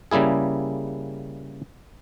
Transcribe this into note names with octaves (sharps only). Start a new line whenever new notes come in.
C#3 G3 A#3 E4 G#4